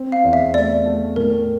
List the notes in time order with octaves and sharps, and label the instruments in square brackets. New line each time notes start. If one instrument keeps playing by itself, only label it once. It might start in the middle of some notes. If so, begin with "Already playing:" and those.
Already playing: [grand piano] C4
[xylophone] F5
[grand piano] E2
[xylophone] E5
[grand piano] A3 [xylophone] D5
[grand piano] A3
[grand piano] A2 [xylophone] A#4